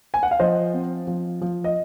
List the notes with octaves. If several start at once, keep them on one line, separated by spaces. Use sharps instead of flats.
G#5
F#5
F5
F3 C5 D#5
C4
F3
F3
D#5